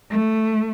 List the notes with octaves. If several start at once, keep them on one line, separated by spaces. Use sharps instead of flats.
A3